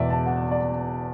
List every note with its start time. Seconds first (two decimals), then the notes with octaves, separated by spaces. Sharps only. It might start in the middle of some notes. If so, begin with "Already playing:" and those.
Already playing: E1 E2 B2 D5 E5
0.10 A5
0.26 F#5
0.51 D5